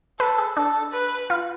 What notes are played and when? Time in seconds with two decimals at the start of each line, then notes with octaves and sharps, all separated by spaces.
0.19 A4 B4
0.38 G#4
0.57 D4 A4
0.93 B4
1.30 F4